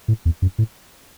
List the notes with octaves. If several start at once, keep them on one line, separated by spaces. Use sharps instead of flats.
A2
E2
F#2
A2